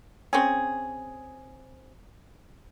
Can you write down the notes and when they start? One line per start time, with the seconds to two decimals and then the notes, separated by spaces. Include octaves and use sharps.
0.33 C4 C#4 G#4